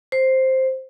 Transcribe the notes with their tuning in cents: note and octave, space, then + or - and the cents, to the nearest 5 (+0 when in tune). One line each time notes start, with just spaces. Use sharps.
C5 +5